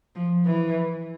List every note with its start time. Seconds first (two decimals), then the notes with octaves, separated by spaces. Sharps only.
0.15 F3
0.46 E3